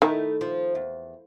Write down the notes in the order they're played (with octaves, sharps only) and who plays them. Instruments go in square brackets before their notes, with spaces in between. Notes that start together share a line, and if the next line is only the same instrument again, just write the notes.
[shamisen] D#3 [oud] A3 D#4 E4
[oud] F3
E2